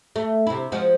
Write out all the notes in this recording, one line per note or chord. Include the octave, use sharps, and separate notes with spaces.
A3
C3 E4
F3 G#3 F#4